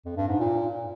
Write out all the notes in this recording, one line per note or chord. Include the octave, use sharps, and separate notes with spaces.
F2
G2
G#2
A#2